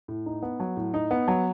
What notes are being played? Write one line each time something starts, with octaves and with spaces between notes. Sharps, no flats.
A2
D#4
B3
F#3
A2
D#4
B3
F#3